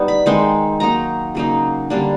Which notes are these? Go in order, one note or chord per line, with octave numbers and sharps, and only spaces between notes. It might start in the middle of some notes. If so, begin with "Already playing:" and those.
Already playing: G3 B3 D#4
B5
D#3 G#3 C4 D#4
F#3 A#3 D#4 A#5
C#3 F#3 A#3 D#4
D3 G3 A#3 D4